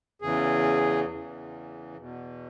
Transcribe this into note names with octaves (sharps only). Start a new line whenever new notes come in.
E2 C#3 E3 G#4
E2 C#3 E3
E2 B2